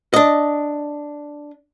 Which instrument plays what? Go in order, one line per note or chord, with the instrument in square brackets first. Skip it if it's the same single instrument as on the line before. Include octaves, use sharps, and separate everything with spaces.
[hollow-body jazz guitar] D4 D#5